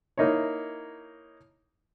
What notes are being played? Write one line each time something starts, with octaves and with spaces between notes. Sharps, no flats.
A#3 D#4 E4 C#5